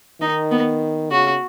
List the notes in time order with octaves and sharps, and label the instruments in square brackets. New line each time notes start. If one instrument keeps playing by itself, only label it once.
[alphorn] D#3 [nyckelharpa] D#4
[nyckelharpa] B3
[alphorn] C#3 [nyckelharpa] F#4